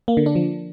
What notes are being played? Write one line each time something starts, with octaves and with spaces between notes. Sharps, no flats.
A#3
D3
D4
F3